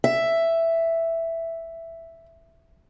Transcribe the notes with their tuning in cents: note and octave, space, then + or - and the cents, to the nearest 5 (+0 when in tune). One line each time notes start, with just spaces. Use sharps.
E5 +5